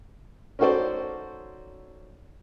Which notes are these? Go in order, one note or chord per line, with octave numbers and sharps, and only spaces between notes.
C#4 D#4 F#4 A4 C5 D5